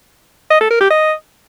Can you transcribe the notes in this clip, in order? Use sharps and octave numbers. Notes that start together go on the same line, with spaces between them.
D#5
A4
A#4
G4
D#5